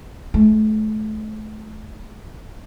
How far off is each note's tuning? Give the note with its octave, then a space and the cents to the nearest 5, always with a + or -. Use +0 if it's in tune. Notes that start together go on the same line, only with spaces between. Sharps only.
A3 -30